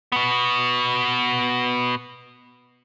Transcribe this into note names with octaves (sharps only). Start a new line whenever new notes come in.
B2 B3